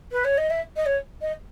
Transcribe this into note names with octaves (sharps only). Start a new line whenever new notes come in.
B4
C#5
D#5
E5
D#5
C#5
D#5